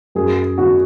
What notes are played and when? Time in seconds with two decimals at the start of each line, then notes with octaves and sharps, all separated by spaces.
0.15 F#2 G#4
0.58 D3 F#4